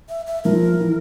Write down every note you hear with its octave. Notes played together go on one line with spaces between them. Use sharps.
E5
E5
F3 A#4
E3